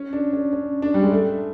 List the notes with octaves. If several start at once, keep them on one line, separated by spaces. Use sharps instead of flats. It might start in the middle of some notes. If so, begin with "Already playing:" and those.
Already playing: C#4
D4
C#4
C#4
D4
G3
G#3
A3